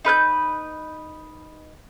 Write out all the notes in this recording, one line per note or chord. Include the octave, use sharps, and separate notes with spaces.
D#4 B4 F#6 G6